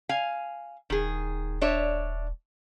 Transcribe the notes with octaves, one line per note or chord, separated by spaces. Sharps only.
F5 G#5
D#1 D#3 G#4
D4 C#5 E5